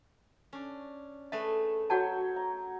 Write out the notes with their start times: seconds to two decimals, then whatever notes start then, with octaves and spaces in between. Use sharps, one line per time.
0.53 C#4 D4
1.32 A3 G#4 B4 E5
1.90 F#3 F#4 C#5 F#5 G5 A5
2.36 A#5